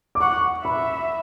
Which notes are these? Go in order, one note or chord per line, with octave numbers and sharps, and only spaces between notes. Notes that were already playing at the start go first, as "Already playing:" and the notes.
D6
F#5 C#6
E5 B5